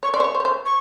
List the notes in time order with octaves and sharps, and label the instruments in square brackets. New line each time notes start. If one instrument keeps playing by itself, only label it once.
[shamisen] C#5 [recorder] C#6
[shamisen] D5 [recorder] C6
[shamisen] C5 [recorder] C#6
[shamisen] C#5
C5
C#5
C5
[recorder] C#6